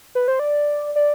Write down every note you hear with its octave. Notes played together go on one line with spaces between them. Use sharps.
B4
C5
D5
D5